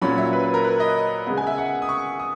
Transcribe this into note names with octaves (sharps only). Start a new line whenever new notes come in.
A#2 F#3 C#4 B5
E5
B4
B4
A#4
B4
D#5
C#3 G#3 B3
G#5
E5
F#5
D#6
C#6
D#6